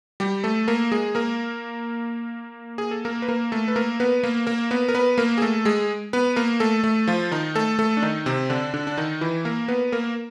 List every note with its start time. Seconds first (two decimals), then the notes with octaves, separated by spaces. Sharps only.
0.20 G3 G4
0.44 A3 A4
0.68 A#3 A#4
0.91 G#3 G#4
1.15 A#3 A#4
2.78 G#4
2.91 A4
3.05 A#3 A#4
3.22 B4
3.28 A#3 A#4
3.52 A3 A4
3.68 B4
3.76 A#3 A#4
4.00 B3 B4
4.23 A#3 A#4
4.47 A#3 A#4
4.71 B3 B4
4.88 A#4
4.94 B3 B4
5.18 A#3 A#4
5.38 G#4
5.42 A3 A4
5.65 G#3 G#4
6.13 B3 B4
6.36 A#3 A#4
6.60 A3 A4
6.84 A3 A4
7.07 F3 F4
7.31 D#3 D#4
7.55 A3 A4
7.79 A3 A4
7.97 D4
8.02 D#3 D#4
8.26 C3 C4
8.50 D3 D4
8.74 D3 D4
8.87 D4
8.97 D#3 D#4
9.21 E3 E4
9.45 A#3 A#4
9.68 B3 B4
9.92 A#3 A#4